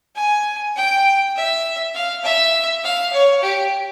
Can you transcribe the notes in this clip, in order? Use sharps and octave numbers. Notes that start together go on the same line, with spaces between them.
G#5
G5
E5
F5
E5
F5
C#5
G4